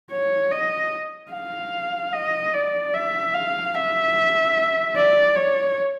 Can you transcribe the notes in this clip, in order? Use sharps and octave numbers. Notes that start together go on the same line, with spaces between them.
C#5
D#5
F5
D#5
D5
E5
F5
E5
D5
C#5